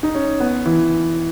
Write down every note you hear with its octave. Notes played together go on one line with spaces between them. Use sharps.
D#4
C#4
B3
E3